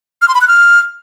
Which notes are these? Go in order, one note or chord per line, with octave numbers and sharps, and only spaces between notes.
F6
C6
B5
F#6
F6